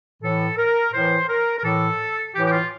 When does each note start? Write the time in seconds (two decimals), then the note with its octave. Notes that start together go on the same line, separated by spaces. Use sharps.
0.23 A2 E3 A4
0.58 A#4
0.93 A2 E3 C5
1.29 A#4
1.59 A#4
1.63 A2 E3 A4
2.34 A2 E3 G4
2.47 G4
2.51 F4